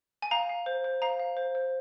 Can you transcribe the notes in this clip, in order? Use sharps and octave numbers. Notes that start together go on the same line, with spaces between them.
G#5
F5 A#5
F5
C5
C5
F5 A#5
F5
C5
C5